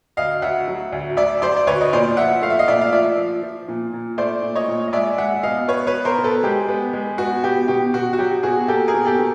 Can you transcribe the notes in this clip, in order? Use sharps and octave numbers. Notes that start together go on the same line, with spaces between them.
D2 D#5 F5
D2 E5 F#5
F#3
D2
D2 D5 E5
F#3 C5 D5
D5
D2 B4 C#5
D#5
A#2 C5 D5
F3 E5 F#5
A3 F5
E5
D#5 F5
A#2 D5 E5
F5
F3 D5 E5
F3
F3
A#2
A#2
A3 C5 D5
A#2
C#5 D#5
A#2
D#5
G#3 D5 E5
G#3 E5 F#5
B2 D#5 F5
B3 B4 C#5
B4 C#5
B3
A#4 C5
B2
A4 B4
G#3 G4
B3
G#3
B3 F#4
B2 G4
B2 G4
B2 F#4
F#4
F#3 G4
B2 F#4 G#4
A#3 G4 A4
G#4 A#4
B2
G4 A4
B2